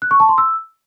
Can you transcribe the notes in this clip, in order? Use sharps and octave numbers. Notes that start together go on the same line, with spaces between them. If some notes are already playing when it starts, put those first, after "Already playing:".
F#6
C#6
A5
C6
E6